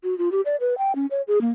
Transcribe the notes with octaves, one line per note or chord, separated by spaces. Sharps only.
F#4
F4
G4
D5
B4
G5
C#4
C#5
G#4
A#3